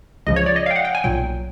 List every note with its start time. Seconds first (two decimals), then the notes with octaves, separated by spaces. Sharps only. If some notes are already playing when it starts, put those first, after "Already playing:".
0.26 C#2 C#3 F3 D#5
0.36 C#5
0.46 D5
0.56 D#5
0.66 F5
0.71 G5
0.76 F#5
0.85 G5
0.95 G#5
1.04 B1 A#2 F#3 G5